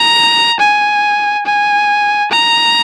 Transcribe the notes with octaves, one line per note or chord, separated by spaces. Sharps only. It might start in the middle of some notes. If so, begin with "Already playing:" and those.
Already playing: A#5
G#5
G#5
A#5